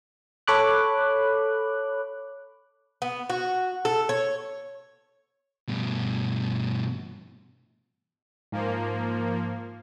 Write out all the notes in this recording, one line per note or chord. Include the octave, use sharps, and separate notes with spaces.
A4 C#5 B5 D6 F#6
B3
F#4
A4
C#5
G2 B2
G#2 F3 A#3